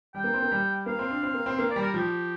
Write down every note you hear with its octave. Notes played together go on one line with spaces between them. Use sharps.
G3 G5
A#3
C4
A#3
G3
A#3 F5
C4
D4
C4
A#3
C4
A#3 F5
D5
G3
A#4
F3 G4